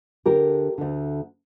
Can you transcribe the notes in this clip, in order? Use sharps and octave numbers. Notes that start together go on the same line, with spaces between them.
D2 D3 G4 A#4
D2 D3